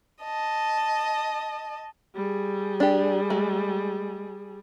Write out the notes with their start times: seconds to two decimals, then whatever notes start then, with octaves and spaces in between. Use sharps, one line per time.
0.24 D#5 A5
2.15 G3 G#4
2.80 D4 G4
3.30 G#3 A3